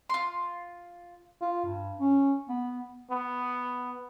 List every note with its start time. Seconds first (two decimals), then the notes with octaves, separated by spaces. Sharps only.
0.10 F4 C6
1.42 F4
1.65 G2
2.00 C#4
2.49 B3
3.10 B3